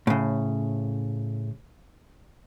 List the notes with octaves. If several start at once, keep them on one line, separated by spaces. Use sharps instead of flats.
A2 C#3